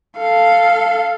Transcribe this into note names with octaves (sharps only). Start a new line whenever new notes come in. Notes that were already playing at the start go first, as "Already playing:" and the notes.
A4 F5